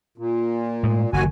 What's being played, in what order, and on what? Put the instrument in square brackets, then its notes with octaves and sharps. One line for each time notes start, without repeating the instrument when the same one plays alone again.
[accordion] A#2
[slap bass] A2 G#3
[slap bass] F#1 D3 D#3 [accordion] D#2 F#4 G#5